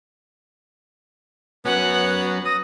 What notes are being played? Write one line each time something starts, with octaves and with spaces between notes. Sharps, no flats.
F#3 B3 C#4 C#5 F#5
D#6 A#6